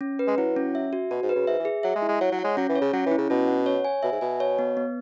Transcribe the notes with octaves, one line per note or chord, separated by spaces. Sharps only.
C#4
B4
G#3
F#3 E4
C#4
E5
F#4
B2 F#4
G#2
B4
C#3
G#2 E5
E3
G#4
F#3 E5
G#3
E4
G#3
F#3 C#5
F#3
F#5
G#3
F#3 C#4
E3
C#5
C#3
F#3 C#4
E3
E4
C#3
B2 C#4
F#5
C#5
G#5
B2 E5
G#2
B2 G#5
C#5
B3
B3